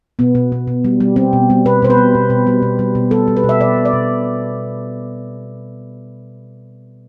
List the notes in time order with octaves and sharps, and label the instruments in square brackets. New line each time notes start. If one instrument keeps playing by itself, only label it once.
[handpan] B2 B3
B2
B2
B2
G3
G3
G3 C4
B2
G3
B2 B4
B2 C5
B4
G3
B2
B2
G3
B2
G3
B2
G3 A4
G3
B4
B2
E5
B2 D5
G3
D5
B2